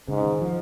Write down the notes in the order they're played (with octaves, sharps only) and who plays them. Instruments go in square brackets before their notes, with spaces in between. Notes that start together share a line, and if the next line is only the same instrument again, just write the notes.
[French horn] G#2 [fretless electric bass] C#3
[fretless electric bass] D#3
F3